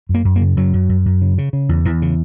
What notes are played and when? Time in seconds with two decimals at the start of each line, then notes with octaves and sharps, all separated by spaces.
0.09 F#2
0.14 A#3
0.25 F#2
0.36 A#3
0.41 C#3
0.57 F#2 F#3
0.73 F#2
0.89 F#2
1.06 F#2
1.21 C#3
1.38 C#3
1.53 C#3
1.69 E2
1.85 E2 E3
2.02 C#3